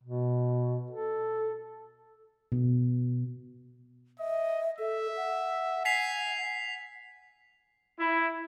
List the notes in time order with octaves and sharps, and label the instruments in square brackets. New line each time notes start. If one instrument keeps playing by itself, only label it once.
[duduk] B2
A4
[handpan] B2
[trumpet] D#5 [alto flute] E5
[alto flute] A4 [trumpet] E5
[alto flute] F#5
[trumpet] G#5 [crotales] B6 C7 F7
[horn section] E4